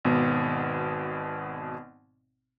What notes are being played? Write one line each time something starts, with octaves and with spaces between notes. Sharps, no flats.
G#1 B2 B3